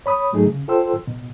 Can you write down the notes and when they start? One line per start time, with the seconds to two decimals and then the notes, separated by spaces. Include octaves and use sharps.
0.06 C#5 B5 D#6
0.32 G#2 F#3 A3 D#4 G#4
0.45 C#3
0.68 F4 A4 C5 G5 C6 E6
1.07 B2